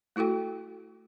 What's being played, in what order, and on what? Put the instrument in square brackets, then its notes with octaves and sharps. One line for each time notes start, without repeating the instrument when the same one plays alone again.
[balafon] A3 E4 F#4 A4 G5